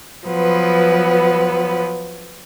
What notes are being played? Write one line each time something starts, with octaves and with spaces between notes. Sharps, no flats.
F3 F#3 B3 B4